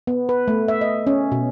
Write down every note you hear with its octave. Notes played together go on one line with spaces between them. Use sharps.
B3
B4
A3
E5
D#5
C#4
B2